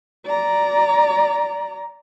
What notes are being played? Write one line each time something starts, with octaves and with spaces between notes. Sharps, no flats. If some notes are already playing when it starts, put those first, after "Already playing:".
D5 A#5